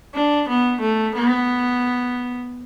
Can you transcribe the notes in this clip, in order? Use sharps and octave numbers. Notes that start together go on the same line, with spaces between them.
D4
B3
A3
B3